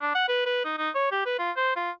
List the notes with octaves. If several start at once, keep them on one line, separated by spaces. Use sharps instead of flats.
D4
F#5
B4
B4
D#4
D#4
C#5
G4
B4
F4
C5
F4